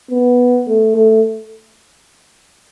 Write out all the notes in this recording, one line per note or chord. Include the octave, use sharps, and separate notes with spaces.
B3
A3
A3